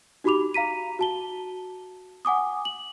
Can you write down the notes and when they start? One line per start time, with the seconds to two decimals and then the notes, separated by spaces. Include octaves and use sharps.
0.24 D#4 F#4 G4 B5 D6 F7
0.54 F5 A#5 B6 D#7
0.99 F#4 A5 G7
2.25 F#5 G#5 D6 D#6
2.65 F#7